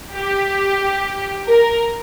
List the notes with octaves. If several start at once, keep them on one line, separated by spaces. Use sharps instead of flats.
G4
A#4